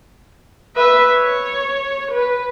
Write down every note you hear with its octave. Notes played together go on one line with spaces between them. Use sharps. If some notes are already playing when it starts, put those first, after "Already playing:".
B4 E5
C#5
B4